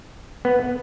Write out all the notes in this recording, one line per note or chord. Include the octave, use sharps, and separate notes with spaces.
B3